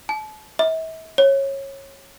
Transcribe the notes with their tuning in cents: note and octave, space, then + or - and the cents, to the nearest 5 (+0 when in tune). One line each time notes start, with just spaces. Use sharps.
A5 -35
E5 -40
C#5 -20